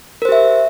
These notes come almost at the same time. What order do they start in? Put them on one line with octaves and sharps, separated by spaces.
A#4 C5 G4 E5